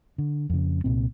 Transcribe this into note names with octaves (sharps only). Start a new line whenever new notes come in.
D3
F2 C#3
C2 A#2 C4